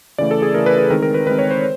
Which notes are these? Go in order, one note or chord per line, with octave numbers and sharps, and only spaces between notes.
C#3 E3 A3 D5
A4
G#4
C#3 E3 A3 A#4
B4
B4
D#3 G#3 C4 A#4
A#4
B4
D#3 G#3 C4 B4
C#5
C5